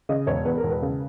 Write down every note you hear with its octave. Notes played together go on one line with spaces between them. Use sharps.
C#3 D#5
E1 C#5
E2 B4
A#4
E1
B4
C#3